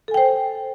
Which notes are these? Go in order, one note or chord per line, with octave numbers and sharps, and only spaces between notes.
A4 C5 G5 G#5